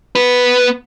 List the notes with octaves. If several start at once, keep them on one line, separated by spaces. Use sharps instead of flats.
B3 B4